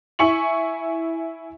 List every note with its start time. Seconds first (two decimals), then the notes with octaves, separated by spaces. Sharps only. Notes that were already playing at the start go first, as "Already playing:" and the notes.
0.19 E4 E5 G#5 C#6 C#7 F#7